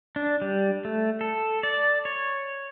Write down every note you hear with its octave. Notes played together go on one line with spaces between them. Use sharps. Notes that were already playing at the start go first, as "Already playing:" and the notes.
D4
G3
A3
A4
D5
C#5